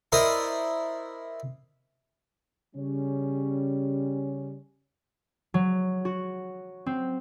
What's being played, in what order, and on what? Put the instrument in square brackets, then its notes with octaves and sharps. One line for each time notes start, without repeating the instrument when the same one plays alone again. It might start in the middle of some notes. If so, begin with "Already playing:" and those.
[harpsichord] E4 A#4 C5 D5 D#5 D#6
[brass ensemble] C#3 G3 C#4
[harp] F#3
F#4
C4